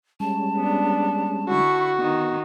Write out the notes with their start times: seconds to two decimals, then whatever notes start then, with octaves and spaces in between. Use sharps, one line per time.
0.20 G3 G#3 C#4 A5
0.57 B3 D4
1.48 D3 E4 F#4 C#6
1.99 D#3 B3 D#4